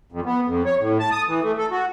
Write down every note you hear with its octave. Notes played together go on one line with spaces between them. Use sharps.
F2
B3
F2
C#5
A2
A5
D#6
E3
A3
A4
F#4